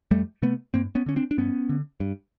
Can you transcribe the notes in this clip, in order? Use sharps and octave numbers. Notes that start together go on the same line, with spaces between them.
F2 G3 A3
C3 A3 B3
G2 A#3 C4
B3 C#4
D3 C#4
C4 D4
D4
G2 B3 C#4
D3
G2